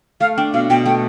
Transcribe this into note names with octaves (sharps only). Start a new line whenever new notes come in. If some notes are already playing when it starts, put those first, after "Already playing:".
A3 F5
D4 G5
B2 F5
B2 G5
A3 G5